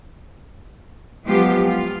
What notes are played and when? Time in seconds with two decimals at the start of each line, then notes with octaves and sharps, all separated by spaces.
1.27 F3 F#3 G#3 B3 F4 G4
1.64 F4